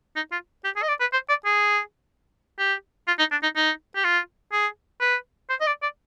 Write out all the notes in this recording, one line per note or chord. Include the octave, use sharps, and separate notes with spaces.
D#4
F4
G4
G#4
D#5
D5
B4
C5
D5
G#4
G4
F4
D#4
D4
D#4
D#4
G4
F4
G#4
B4
C5
D#5
D5
D5